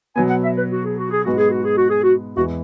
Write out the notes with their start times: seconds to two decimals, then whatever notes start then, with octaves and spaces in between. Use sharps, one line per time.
0.16 B2 F#3 B3 G#5
0.30 F#5
0.44 E5
0.57 B4
0.71 F#4
0.85 G#4
0.97 F#4
1.10 G#4
1.24 G#2 G#3 B3 F#4
1.37 G#4
1.50 F#4
1.64 G#4
1.77 F#4
1.89 G#4
2.03 F#4
2.37 E2 E3 G#3 B3 F#4